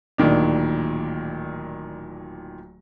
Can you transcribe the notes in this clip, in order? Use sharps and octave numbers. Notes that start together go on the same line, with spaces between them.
D1 A#2 D#3 D4